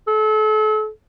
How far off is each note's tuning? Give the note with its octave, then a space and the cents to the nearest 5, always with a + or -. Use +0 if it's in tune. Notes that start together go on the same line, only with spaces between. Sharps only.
A4 -35